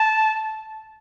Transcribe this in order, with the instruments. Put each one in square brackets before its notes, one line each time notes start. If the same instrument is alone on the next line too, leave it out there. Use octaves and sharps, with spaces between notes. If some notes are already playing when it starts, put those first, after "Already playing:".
Already playing: [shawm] A5